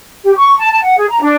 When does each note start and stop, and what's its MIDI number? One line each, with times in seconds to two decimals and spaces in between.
0.23 0.31 67
0.36 0.55 85
0.59 0.68 81
0.71 0.80 81
0.83 0.96 78
0.97 1.06 68
1.10 1.21 82
1.21 1.36 62